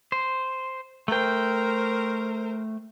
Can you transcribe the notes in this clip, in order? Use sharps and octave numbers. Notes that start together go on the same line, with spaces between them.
C5
A3 A#4 C5 G5